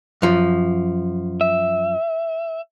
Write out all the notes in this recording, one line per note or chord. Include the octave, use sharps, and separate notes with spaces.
F#2 F3
E5